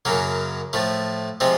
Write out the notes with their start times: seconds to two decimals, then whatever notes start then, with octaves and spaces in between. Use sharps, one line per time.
0.05 F#2 C#3 F#3 A#3
0.73 A2 F3 A3
1.40 C3 F3 G#3 C4